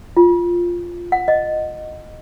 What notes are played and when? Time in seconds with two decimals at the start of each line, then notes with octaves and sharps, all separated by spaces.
0.17 F4
1.12 F#5
1.28 D#5